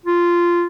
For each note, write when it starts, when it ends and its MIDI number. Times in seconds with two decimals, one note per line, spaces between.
0.06 0.67 65